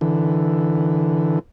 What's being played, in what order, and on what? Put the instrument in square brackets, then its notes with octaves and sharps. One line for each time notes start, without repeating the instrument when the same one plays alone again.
[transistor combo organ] D3 E3